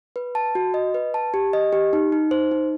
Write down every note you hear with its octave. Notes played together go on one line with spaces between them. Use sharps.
B4
A5
F#4
D#5
B4
A5
G4
D#5
G4
D#4
D#4
C5
D#4